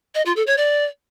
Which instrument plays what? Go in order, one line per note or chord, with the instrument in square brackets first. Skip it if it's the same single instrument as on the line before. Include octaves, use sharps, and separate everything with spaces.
[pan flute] D#5
F4
A4
C#5
D5